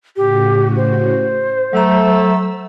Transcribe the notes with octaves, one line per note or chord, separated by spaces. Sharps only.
A2 C#3 F#4 G4
C5
F#3 A3 A#5 E6